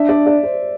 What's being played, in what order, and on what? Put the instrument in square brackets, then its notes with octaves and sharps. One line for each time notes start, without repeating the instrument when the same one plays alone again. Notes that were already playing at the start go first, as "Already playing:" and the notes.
Already playing: [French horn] D4 [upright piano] E5
[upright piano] D5
D5
C5